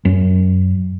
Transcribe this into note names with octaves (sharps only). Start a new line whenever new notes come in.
F#2